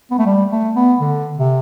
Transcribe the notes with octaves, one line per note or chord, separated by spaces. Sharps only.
B3
A3
G3
A3
B3
D3
C3